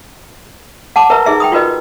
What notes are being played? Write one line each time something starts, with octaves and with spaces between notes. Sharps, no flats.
F#5 A5 D6
A#4 B4 E5 A#5
D#4 G#4 E5 A#5
G5 B5 D#6
F4 F#4 A#4 B4 D#5